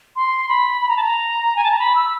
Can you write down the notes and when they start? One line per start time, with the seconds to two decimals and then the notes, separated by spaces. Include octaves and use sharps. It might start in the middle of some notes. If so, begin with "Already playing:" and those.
0.16 C6
0.49 B5
0.81 B5
0.88 A#5
0.96 A5
1.03 A#5
1.56 G#5
1.64 A5
1.71 A#5
1.79 B5
1.95 E6